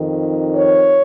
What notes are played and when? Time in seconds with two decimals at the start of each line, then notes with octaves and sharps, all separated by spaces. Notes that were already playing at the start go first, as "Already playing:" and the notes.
Already playing: F2 D#3
0.54 C#5